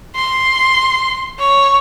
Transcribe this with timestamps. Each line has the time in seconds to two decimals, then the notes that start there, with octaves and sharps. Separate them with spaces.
0.15 C6
1.39 C#5